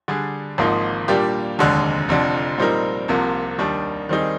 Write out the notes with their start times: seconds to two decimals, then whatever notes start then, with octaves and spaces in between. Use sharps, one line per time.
0.08 D3 G3 D4 G#4
0.58 G#1 G#2 F3 A#3 D#4
1.08 A#2 G3 A#3 D4 G4
1.59 F1 D#2 D3 G#3
2.09 F1 F2 D3
2.58 A#2 G3 C4 D#4 A#4
3.08 C2 C3 F3 A#3
3.58 D#2 D#3 G3 D4
4.09 D#3 G3 C4 D#4 G#4